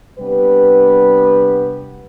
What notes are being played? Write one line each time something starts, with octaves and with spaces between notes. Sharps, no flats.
C3 G3 B3 D4 G4 B4